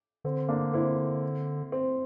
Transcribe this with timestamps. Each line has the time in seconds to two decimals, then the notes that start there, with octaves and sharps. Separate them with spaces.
0.24 D3 C4
0.48 A#3 D4
0.74 C4 E4
1.72 C4